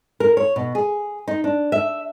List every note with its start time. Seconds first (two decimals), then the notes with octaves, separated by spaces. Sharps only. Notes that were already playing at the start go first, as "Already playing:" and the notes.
0.20 A#4
0.37 C#5
0.56 B2
0.75 G#4
1.27 D#4
1.44 D4
1.72 E5